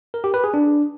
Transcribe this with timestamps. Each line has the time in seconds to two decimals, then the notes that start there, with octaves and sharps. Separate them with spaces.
0.14 A#4
0.24 G4
0.34 B4
0.44 G#4
0.54 D4